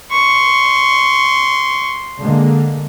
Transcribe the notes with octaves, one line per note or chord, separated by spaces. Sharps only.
C6 C#6
D3 G#3 A#3